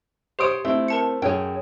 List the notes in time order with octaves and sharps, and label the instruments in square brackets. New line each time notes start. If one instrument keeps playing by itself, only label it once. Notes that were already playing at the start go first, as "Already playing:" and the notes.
[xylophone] G4 D7 [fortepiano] C5 C#5 D#6
[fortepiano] A3 E4 [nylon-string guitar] C4
[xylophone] A#4 A5 C#7
[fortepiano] F#2 [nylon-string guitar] G#4 C#5 G5